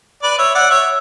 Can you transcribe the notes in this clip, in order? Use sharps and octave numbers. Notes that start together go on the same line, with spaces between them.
B4 D5
C#5 E5
D5 F#5
C#5 E5